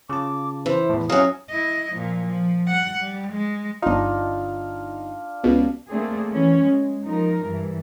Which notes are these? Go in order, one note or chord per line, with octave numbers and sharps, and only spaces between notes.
C#3 F4 A5 D6
E3 C5
E2 A2
F#3 C#4 F5 F#5 D#6
E4 D#5
A#2 F3
F3
G3 F#5
G3
G#3
G1 D4 D#4 F4
C#2 B2
A3 A#3 C4 D4 G#4
E3 C#4
G#3
F3 D#4 A#4
G2 E3